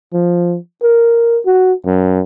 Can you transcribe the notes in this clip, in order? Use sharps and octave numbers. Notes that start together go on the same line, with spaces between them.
F3
A#4
F#4
F#2